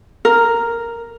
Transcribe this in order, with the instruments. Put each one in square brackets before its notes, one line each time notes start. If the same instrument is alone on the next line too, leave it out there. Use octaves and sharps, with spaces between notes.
[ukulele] A#4